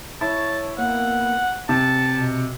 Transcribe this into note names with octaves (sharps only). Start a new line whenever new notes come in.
E4 C#5 A5
A#3 B3 F#5
C3 A5 C#7
B2